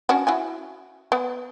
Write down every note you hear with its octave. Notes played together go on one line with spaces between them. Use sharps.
C#4 D4 F#4
E4 F#4 G#5
B3